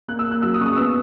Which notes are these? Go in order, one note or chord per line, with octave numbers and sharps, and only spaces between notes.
A#3 F#6
E6
A#3
F#6
F#3 E6
D#6
C#3 C#6
D#6
B3 E6